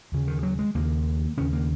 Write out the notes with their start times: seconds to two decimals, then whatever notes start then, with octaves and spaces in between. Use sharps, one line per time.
0.12 D#2 C#3
0.28 D#3
0.43 F#3
0.59 G#3
0.75 D#2 C#3 A#3
1.37 D#2 C#3 C#4
1.53 A#3